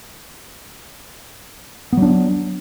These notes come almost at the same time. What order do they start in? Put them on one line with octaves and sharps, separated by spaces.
B3 F#3 D4